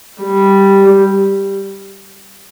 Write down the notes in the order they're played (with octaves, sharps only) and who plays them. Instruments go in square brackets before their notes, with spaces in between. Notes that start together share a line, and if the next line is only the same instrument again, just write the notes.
[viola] G3